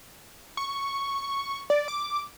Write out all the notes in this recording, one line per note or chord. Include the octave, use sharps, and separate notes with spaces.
C#6
D5
D6